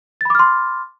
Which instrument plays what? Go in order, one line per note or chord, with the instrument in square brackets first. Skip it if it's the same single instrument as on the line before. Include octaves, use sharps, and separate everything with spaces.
[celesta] A6
B5
D6
F6
C6